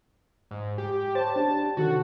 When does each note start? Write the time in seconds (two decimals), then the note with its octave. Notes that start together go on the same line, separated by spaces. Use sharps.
0.51 G#2
0.78 G4
1.15 C5 C#5 A5
1.36 D4 G4
1.77 C3 D#3 F#4 A4